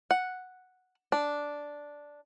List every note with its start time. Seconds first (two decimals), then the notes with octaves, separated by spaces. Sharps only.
0.11 F#5
1.12 D4